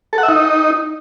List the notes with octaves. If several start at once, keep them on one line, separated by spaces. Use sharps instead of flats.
A4
F#5
E5
D#4